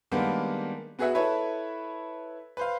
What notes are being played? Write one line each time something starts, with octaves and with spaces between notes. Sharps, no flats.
D#3 G3 G#3 A#3 B3 D4
B3 F#4 G#4 B4 E5 F#5
E4 A4 B4 C#5 E5
B4 C5 F5